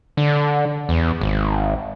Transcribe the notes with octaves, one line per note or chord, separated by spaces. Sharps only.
D3
E2
G#1